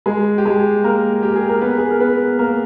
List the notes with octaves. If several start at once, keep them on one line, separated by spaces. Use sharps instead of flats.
G#3 G#4
G4
G#3 G#4
A#3 A#4
G4
G#4
A#4
B3 B4
G#4
A#4
B3 B4
A#3 A#4